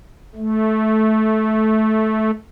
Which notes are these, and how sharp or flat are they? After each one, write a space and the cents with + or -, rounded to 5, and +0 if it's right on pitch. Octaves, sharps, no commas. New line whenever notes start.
A3 -15